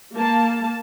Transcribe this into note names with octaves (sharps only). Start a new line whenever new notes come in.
A#3 A5